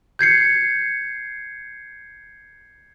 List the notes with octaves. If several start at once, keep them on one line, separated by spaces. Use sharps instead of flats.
G6 G#6 C7 C#7